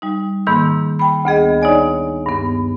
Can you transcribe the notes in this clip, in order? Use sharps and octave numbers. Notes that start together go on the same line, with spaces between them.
G3 D#4
G#2 D#3 A#3 B5 E6
G5 B5
D2 B3 G#4 D#5
D#4 C#5 D5 G#5
G2 B3